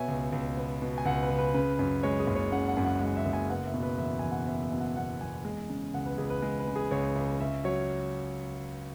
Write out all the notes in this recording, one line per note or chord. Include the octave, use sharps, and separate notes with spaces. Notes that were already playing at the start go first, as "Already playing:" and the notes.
Already playing: B2 B3 C#5 E5 G#5
C#2
C#2
B3
B2
G#5
C#2 F#5
B4
C#2
B4
C#3 B4
F#2
G#3 C#5
G#4
F#1
C#5
C#3 F#5
F#5
F#2
F#5
G#3 F#5
E5
F#1
G#5
B3 F#5
E5
B2
B4
E2 E5
E2 G#5
F#5
B3 E5
E5
B2
F#5
E2 F#5
E2 G#5
G#3
C#3
C#2 F#5
B4
C#2 G#4
B4
G#3
B4
C#3
G#4
C#2 C#5
C#2
C#4 E5
F#3 C#5